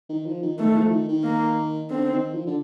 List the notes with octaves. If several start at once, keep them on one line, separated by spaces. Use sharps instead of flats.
D#3
F3
D#3
D#3 A3
F3
D#3
D#3
A#3
D3 C4
D#3
F3
D3